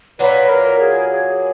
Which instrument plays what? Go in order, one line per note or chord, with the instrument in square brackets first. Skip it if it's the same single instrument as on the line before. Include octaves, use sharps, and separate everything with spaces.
[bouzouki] A#2 F#3 A#3 F4 [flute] B4
[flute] A#4
G#4
G#4